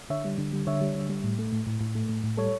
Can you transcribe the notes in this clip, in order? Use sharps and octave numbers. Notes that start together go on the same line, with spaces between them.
D3 C#5 E5
G3
D3
G3
D3 C#5 E5
G3
D3
G3
A2
A3
A2
A2
A2
A3
A2
A2
G3 A4 C#5